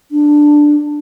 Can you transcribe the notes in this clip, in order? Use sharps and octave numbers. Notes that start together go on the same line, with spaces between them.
D4